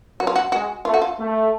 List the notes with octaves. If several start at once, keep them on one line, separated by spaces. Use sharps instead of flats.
F#3 F#4
F4
F#4
G#3 F#4
A3 F4
F#4
F4
A3